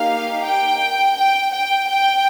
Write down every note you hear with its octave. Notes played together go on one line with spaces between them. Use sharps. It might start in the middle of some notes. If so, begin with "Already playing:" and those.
Already playing: A#3 D#4 G4 F5
G5
G5
G5
G5